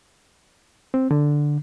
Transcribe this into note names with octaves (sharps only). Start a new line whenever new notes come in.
C4
D3